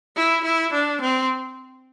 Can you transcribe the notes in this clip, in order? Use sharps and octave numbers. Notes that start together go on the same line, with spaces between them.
E4
E4
D4
C4